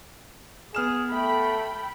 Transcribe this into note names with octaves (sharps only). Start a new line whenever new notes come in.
B3 G#4 F6 E7
A3 A4 G5 B5